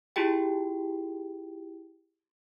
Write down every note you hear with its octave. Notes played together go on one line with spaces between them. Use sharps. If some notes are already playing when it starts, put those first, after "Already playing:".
E4 F4 G4 G#4 G5